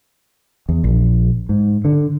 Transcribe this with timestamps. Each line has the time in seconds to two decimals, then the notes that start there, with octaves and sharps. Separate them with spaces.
0.69 E2
0.84 A#1
1.49 G#2
1.85 D3